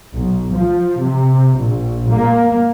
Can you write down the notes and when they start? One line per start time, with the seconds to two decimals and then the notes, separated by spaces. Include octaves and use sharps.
0.13 B1
0.51 F3
0.99 C3
1.55 A#1
2.09 A#3